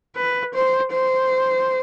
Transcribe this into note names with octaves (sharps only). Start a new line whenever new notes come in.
B4
C5
C5